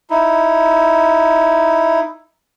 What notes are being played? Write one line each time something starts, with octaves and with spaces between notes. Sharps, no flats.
D#4 E4